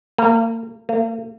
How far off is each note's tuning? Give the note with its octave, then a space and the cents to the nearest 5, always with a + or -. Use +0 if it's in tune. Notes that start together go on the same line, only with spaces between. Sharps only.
A#3 -35
A#3 -45